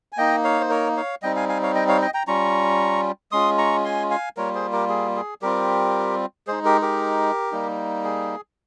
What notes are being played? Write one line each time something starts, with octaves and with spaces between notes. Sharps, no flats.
G#5
A#3 D#4 D#5 G5
C#5 F5
C5
A#4 C#5
C#5 F5
G3 C4 D#4 D#5 G5
F5 G#5
F5 G#5
C#5 F5
D#5 G5
C#5 F5
D#5 G5
G5 A#5
G3 C#4 F4 A#5 C#6
G#3 C#4 F4 C6 D#6
A#5 C#6
G#5 C6
F5 G#5
G3 A#3 F4 A#4 C#5
G#4 C5
G4 A#4
G#4
G#4
G3 C4 F4 G4 A#4
G#3 D#4 G#4 C5
G4 A#4
G4 A#4
G3 A#3 D#4
G#4